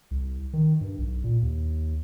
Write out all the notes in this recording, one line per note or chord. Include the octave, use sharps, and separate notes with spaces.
C2
D#3
G2
B1
A#2
D#2